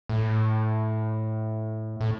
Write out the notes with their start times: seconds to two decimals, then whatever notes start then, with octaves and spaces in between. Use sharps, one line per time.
0.09 A2
2.01 A2